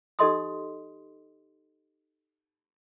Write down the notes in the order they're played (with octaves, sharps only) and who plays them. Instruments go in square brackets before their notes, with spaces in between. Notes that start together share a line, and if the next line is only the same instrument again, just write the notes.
[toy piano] D#4 G4 A4 D#5 C6 D#6